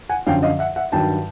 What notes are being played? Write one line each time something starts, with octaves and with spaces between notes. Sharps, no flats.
F#5 G#5
F#2 D3 F3 F5 G5
D#5 F5
E5 F#5
E5 F#5
G2 D#3 F#3 G5 A5